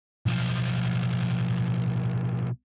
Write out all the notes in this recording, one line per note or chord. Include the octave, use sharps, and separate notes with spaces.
B1 F3